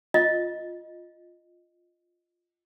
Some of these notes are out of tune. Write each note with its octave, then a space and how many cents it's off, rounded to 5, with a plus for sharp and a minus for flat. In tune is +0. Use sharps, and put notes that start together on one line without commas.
F4 +0 D#5 +0